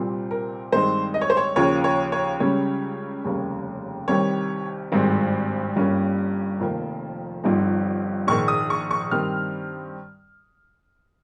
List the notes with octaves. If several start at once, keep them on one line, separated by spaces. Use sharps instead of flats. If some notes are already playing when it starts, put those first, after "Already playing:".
Already playing: C2 A#2 G3 C4
A#4
G2 D#3 G#3 C4 D#4 C5
D#5
C#5
C5
C#5
D#2 C#3 F3 A#3 C#5
C#5
C#5
C#2 C#3 G3 C#5
F1 D#2 C#3 G3 A#3
C2 C3 D#3 G3 C#5
G#1 G2 D#3 G#3 C4
G1 G2 G3 A#3 C#4
F1 F2 D#3 A#3
G1 G2 F3 C4 D#4
A#1 G#2 D#3 G#3 C#6
D#6
C#6
C#6
G2 D#3 G3 C4 F6